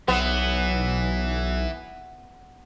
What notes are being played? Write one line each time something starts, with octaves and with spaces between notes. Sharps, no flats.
B1 E3 F#3 B3